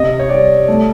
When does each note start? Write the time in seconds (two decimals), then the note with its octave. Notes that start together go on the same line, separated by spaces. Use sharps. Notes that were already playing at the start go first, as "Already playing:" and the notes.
Already playing: C3 D#5
0.19 C#5
0.29 G3 D5
0.68 A3